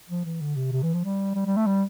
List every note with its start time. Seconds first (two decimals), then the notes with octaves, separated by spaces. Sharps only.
0.09 F3
0.25 E3
0.41 D3
0.56 C3
0.72 C3
0.83 E3
0.93 F3
1.04 G3
1.35 G3
1.46 G3
1.56 A3
1.66 G3